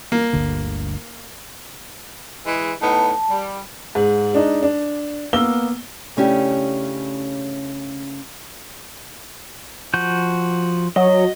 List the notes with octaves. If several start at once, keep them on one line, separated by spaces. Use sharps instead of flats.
A#3
G1 D2 D3
E3 G#3
A2 B3 D#4 A5
G3
G#2
G#3 D4 D#4
D4
A#3 B3 E6 G7
C#3 A3 C#4 D4 E4 G4
F3 F#4 G6
F#3 D#5